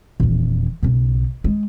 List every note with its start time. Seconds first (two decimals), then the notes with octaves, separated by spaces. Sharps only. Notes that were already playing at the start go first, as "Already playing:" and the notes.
0.20 D#1 E2
0.83 B1 C#3
1.44 G#3